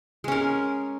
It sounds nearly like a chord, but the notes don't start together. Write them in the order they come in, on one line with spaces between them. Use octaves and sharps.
G#3 C#4 A#4